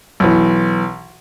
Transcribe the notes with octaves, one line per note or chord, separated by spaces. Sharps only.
B1 E3